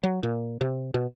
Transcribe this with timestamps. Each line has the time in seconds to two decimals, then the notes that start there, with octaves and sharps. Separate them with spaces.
0.03 F#3
0.23 A#2
0.61 C3
0.94 B2